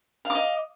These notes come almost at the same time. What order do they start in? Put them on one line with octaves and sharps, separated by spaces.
F5 D6 D#5